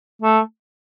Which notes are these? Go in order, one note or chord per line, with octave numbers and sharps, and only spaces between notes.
A3